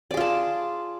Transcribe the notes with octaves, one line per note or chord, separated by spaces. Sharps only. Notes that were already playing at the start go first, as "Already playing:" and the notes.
F4 G#4 D5 A5